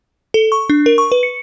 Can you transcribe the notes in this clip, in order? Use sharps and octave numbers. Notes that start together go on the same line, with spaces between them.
A4
C#6
D4
A#4
C#6
B4
C#7